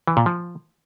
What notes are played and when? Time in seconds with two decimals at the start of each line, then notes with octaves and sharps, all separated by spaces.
0.07 E3
0.17 A#2
0.26 F3